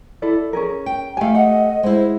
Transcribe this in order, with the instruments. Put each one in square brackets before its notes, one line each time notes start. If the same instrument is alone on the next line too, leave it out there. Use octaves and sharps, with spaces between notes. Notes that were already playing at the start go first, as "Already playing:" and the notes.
[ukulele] E4 A4 D5
C#4 G#4 A#4
[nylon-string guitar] G5
[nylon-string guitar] A3 G4 [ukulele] F5 G#5
[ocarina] D#5 [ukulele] F#5
[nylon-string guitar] G#3 E4 [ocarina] C5